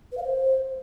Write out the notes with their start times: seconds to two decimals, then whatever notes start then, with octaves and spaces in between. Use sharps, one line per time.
0.12 B4
0.17 F5
0.23 C5